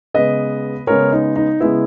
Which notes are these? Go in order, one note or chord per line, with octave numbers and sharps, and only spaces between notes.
C#3 G#3 B3 B4 D#5
C#3 G#3 B3 A#4 C#5
D#4
D#4
C#3 G#3 B3 E4